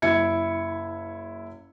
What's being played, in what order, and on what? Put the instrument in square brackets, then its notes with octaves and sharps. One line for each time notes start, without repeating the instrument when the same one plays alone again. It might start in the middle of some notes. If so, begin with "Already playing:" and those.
[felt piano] F#1 E4 E5 G#6 C#7